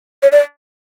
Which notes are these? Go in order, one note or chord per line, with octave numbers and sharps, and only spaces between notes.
C#5
D5